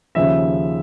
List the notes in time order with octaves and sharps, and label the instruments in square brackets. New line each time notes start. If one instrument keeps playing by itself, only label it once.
[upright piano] D#2 C#3 F3 E5